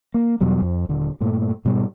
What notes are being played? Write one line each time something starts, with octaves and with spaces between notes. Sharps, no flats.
A#3
E2 B2 F#3 G3
F2
D#1 D3
G2 A#2 A3
G#2 B2 G3